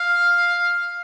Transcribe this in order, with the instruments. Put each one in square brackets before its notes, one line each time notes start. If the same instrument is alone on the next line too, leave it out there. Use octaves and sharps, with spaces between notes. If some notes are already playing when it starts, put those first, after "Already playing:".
Already playing: [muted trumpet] F5